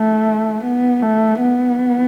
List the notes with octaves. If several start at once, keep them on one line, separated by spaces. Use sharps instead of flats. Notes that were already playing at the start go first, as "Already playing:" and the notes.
Already playing: A3
B3
A3
B3